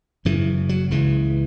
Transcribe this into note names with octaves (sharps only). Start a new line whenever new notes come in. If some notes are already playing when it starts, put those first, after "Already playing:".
F#1 F#2 C#3 E3
F#3
C#2 C#3 E3